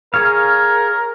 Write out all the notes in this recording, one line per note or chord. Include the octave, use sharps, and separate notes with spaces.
G#4 A#4 C#5 F5